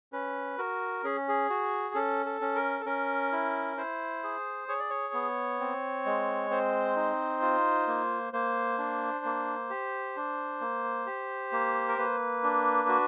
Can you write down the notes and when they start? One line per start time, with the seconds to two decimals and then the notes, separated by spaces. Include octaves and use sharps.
0.13 C#4 B4
0.58 F#4 A#4
1.04 C#4 G#4
1.28 G#4
1.50 F#4
1.95 C#4 A4
2.26 A4
2.41 C#4
2.55 A#4
2.80 A4
2.86 C#4 A#4
3.32 E4
3.77 E4 C5
4.24 G#4
4.68 G#4 C#5
4.80 D5
4.90 C#5
5.14 B3
5.60 C4
6.06 G#3
6.50 C4 C5
6.96 D#4
7.42 F4
7.87 A#3
8.33 A#3 C5
8.78 D4
9.25 A#3
9.70 G4
10.16 D4
10.61 A#3
11.06 G4
11.52 A#3
11.88 A#4
11.98 A#3 B4
12.43 D4
12.89 F#4